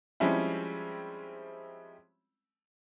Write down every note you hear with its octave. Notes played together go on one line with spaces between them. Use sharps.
F3 G3 G#3 C4 C#4 E4